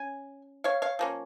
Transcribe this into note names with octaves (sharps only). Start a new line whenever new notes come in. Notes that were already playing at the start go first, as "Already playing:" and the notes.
Already playing: C#4 G#5
C#5 F5
C#5 F5
F3 A#3 C#4